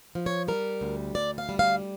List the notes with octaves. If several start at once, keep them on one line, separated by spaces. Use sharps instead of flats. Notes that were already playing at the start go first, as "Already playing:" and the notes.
F3
C#5
G3 A#4
D2
D2 D5
F5
G3
F5